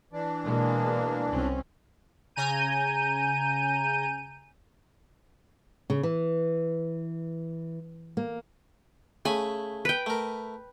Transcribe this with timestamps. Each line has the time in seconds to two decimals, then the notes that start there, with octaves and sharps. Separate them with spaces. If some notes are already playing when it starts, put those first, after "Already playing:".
0.12 E3 D4
0.44 B2 G#3 A#3
1.30 C2 C4 C#4
2.36 C#3 G#5 A#5 G6 D#7
5.90 C#3
6.03 E3
8.17 A#3
9.25 C#3 A3 G#5 B5
9.85 B4 G5
10.06 A3 A#4